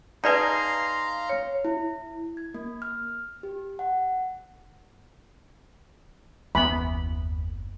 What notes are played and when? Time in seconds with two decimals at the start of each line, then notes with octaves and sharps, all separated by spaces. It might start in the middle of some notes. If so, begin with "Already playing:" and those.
0.24 D#4 G#4 B4 D5 F5 A5 A#5 C6
1.29 C#5
1.65 E4
2.37 G#6
2.54 A#3
2.82 F6
3.43 G4
3.79 F#5
6.55 F#1 D#2 E3 B3 B5